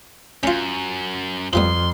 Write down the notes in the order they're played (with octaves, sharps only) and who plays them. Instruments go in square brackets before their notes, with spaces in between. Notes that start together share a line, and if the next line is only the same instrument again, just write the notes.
[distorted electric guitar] F#2 [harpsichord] C#4 F4
[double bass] F2 [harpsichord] F3 G3 B3 [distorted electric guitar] C6